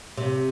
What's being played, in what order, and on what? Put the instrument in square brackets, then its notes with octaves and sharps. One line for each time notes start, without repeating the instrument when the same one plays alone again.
[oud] C3